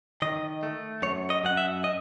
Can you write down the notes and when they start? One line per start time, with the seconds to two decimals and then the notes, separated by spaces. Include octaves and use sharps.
0.22 D#3 D#5
0.63 A3
1.02 F#2 C#5
1.30 D#5
1.44 F#2 F#5
1.57 E5
1.84 D#5